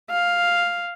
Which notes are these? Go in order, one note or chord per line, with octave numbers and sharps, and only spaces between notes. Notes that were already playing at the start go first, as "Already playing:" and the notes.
F5